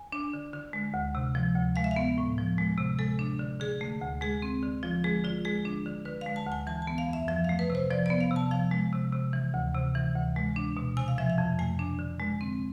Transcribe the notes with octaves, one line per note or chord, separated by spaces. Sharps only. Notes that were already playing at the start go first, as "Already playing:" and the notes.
Already playing: G#5
D4
D3
D3
G#3
D2
C3
F3
D2
G#3 F5
E5
F5
B3
A2
F3
G#3
C3
G#3 A4
D4
D3
D3 G#4
A3
D2
G#3 G#4
C4
D3
F3 F4
G#3 G#4
D3 F4
G#3 G#4
D4
D3
D3 B4
G#3 F5
A5
D2
G#5
E3 A5
A5
B3
F5
F2 E5
F3 E5
A3 F5
B4
C3
C5
F3 D5
B3 D5
F5
C3
A5
F3 F5
G#3
C3
C3
E3
D2
C3
E3
D2
G#3
D4
B2
C3 G#5
F5
F3 E5
F5
F2
A3 G#5
D4
D3
G#3
C4